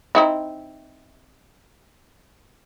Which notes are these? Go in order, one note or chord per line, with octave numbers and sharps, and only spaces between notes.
C4 D#4 E4